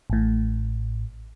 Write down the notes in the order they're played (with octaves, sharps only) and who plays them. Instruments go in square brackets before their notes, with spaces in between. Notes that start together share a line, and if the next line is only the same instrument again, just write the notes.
[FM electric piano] A1 A2